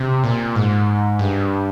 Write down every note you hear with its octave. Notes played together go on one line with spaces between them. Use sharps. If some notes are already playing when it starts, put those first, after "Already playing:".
Already playing: C3
A#2
G#2
G2